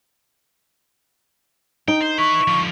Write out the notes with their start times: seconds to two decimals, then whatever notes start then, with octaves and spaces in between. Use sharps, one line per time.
1.88 D#4 G5
2.01 C5
2.19 E4 B4 C#6
2.48 D3 F3